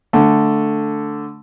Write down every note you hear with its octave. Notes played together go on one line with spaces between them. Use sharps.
D3 A3